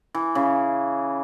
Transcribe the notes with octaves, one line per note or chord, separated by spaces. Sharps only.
E3
C#3